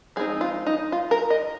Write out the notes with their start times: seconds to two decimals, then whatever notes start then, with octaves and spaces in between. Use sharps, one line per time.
0.16 F3 G#3 C4 D#4 G#4
0.41 F4
0.67 D#4
0.92 F4
1.11 A#4
1.30 D#5